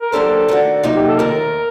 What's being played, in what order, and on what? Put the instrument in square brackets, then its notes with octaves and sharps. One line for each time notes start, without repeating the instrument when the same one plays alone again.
[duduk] A#4
[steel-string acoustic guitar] F#3 A#3 D4 G4 C5 [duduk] A4
[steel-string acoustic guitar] D#3 A3 D4 F#4
C3 F#3 A#3 D#4
[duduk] G4
A4
[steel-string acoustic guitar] D#2 D#3 A3 [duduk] A#4